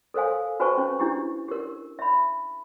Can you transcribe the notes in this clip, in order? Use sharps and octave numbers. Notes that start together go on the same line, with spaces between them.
A4 A#4 C5 F5 G#5
F#4 B4 C5 G#5 A5 C#6
C#4 C5
D4 E4 G4
G4 A#4
E5 B5